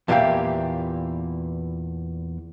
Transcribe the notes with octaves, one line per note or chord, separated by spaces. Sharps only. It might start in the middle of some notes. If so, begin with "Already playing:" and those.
E2 A#2 E3 G4 F5 G5